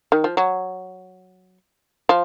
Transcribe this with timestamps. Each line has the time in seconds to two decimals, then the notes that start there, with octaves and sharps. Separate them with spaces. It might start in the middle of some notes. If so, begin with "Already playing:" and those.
0.12 D#3
0.24 F3
0.37 F#3
2.09 F3